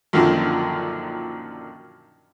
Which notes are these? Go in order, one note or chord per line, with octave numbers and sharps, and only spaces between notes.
F#2 A#2 D3 D#3 F3